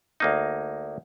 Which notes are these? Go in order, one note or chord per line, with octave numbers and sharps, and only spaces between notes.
D2 A#3 D#4